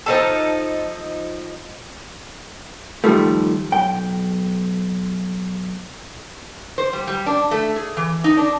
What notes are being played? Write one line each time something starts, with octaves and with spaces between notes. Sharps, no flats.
F3 D#4 A4
D#3 F3 G3 A3
B1 G5
C5
G3
G3
D4
A3
G#4
E3
D#4
D4